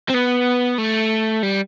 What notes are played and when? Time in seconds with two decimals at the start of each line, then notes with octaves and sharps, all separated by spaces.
0.09 C4
0.14 B3
0.78 A3
1.43 G3